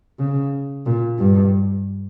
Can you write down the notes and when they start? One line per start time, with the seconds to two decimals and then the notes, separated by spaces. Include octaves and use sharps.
0.19 C#3
0.86 A#2
1.19 G2